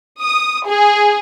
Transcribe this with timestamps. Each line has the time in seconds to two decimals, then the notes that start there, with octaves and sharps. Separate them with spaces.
0.21 D#6
0.66 G#4